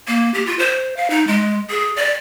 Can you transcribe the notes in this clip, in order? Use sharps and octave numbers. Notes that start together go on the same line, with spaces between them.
A#3
G4
F4
C5
F5
D#4
G#3
G#4
D5